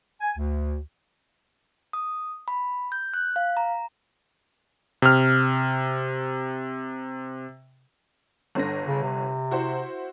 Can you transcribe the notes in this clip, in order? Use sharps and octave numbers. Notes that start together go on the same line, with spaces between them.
G#5
D2
D#6
B5
G6
F#6
F5
A#5
C3 F6
G1 D3 A#6
C#3
C3
E4 F#4 C5